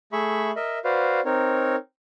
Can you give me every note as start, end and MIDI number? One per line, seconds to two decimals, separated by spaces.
0.13 0.51 57
0.13 0.51 68
0.13 0.51 76
0.13 0.51 83
0.13 0.51 85
0.56 0.78 70
0.56 0.78 75
0.56 0.78 76
0.85 1.20 66
0.85 1.20 71
0.85 1.20 72
0.85 1.20 74
0.85 1.20 77
1.25 1.76 60
1.25 1.76 63
1.25 1.76 70
1.25 1.76 73